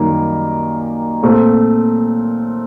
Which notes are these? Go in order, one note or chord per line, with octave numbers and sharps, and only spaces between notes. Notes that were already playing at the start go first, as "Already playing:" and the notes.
Already playing: F#2 D#3 G3 A#3
A#2 A3 C4